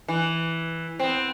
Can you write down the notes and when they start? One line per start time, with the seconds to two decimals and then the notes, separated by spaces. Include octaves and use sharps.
0.08 E3
0.99 B3 C4